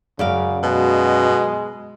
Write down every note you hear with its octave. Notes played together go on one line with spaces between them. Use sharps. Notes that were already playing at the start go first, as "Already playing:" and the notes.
F#2 C#3 D5 F5
B2 G#3